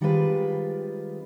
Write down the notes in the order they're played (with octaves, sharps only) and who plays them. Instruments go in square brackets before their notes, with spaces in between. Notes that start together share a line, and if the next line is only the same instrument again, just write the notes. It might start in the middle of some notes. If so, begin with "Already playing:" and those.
[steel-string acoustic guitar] D#3 G3 G#3 C4 F4 B4